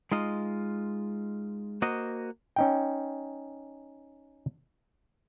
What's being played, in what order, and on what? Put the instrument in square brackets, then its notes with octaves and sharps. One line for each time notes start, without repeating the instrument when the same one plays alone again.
[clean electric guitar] G#3 D#4 F4 D#5
A#3 F#4 C5 D#5
[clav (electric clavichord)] C#4 D#4 G5